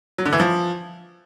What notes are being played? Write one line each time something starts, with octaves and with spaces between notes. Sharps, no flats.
F#3
D3
E3
F3